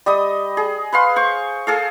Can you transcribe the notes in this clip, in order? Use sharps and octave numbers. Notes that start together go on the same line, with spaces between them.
G3 D#5 D#6
G#4
B4 F5 C6
C5 C#6
G#4 A4 F5